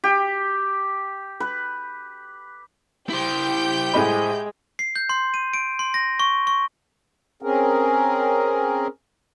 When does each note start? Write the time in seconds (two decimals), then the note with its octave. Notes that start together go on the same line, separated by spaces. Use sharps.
0.04 G4
1.40 B4
3.09 E4 G4 C5 G5 G6
3.93 A2 G#3 D#5 B5
4.79 C7
4.96 G6
5.09 C6
5.34 D#7
5.54 D7
5.79 C6
5.94 A#6
6.20 C#6
6.47 C#6
7.42 C4 C#4 G#4 A#4